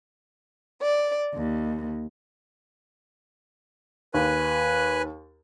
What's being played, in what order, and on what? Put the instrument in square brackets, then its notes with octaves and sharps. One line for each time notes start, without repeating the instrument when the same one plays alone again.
[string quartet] D5
D#2
[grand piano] D#2 [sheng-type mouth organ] B4 G#5 F#6